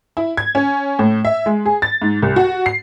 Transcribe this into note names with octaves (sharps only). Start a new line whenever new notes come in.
E4
G#6
C#4
A2
E5
G#3
G#4
A6
G#2
C2
F#4
C7